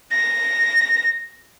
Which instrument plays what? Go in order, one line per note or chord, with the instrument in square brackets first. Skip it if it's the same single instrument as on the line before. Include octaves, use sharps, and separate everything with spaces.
[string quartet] A#6